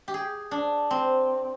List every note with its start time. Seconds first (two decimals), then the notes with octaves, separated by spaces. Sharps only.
0.08 G4
0.14 G#4
0.51 D4
0.91 C4